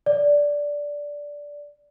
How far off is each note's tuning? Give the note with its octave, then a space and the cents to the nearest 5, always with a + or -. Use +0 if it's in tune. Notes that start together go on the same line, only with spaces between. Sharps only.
D5 -10